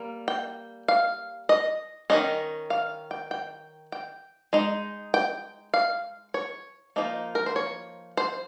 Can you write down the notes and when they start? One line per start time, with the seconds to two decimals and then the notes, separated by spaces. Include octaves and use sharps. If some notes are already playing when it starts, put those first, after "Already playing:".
Already playing: G3 A#3
0.28 G5
0.88 F5
1.49 D#5
2.10 D#3 A#3 C#4 D#5
2.70 F5
3.11 G5
3.31 G5
3.92 G5
4.53 G#3 D#4
5.14 G5
5.74 F5
6.34 C#5
6.96 F3 A#3 D#4
7.35 A#4
7.46 C5
7.56 C#5
8.17 C5